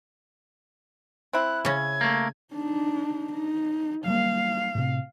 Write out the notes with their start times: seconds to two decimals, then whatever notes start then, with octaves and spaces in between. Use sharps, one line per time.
1.33 C4 E4 F#6
1.65 C#3 C#4 G#6
2.01 A3 A#3
2.53 D4 D#4
3.33 D#4
4.06 F#3 G3 A#3 F5
4.75 A2 C3